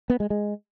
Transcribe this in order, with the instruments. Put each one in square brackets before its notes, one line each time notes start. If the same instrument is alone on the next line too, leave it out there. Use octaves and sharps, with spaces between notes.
[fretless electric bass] B3
G#3
G#3